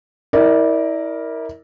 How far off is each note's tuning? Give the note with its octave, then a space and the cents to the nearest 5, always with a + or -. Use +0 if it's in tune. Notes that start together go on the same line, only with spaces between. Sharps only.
E4 -30 A#4 +0 D5 +0